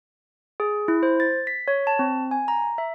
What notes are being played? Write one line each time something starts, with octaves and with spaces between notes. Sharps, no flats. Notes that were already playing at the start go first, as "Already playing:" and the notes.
G#4
E4
C5
A6
B6
C#5
A5
C4
G#5
A#5
E5